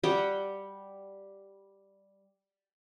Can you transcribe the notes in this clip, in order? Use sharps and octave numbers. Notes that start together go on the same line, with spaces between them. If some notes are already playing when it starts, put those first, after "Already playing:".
G3 G4 F#5 G5